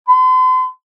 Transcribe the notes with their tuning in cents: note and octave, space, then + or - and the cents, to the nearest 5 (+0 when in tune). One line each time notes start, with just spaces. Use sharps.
C6 -40